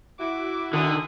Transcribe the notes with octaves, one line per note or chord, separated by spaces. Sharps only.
E4 F#4 D6
D3 D#3 G#5 D#6